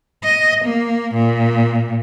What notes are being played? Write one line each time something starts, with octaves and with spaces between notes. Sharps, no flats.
D#5
A#3
A#2